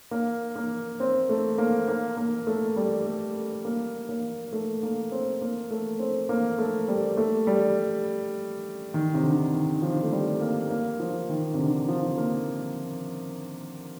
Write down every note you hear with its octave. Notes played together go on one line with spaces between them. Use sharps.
A#3
A#3
C4
A3
A#3
A#3
A#3
A3
G3
A3
A#3
A#3
A3
A#3
C4
A#3
A3
C4
A#3
A3
G3
A3
G3
D#3
C3
D3
D#3
F3
A3
G3
A#3
A#3
F3
D#3
C3
D3
F3
A#3